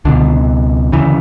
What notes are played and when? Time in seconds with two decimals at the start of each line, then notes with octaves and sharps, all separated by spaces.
0.05 C#2 B2 D3
0.92 D2 C#3 E3